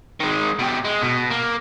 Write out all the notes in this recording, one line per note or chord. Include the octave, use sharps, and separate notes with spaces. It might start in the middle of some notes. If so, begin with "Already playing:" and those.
D#3 G#3
B2 G4
G#3
B2
A#3